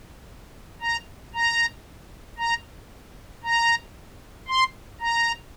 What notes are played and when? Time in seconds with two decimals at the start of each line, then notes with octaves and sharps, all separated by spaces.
0.81 A#5
1.35 A#5
2.38 A#5
3.44 A#5
4.48 C6
5.01 A#5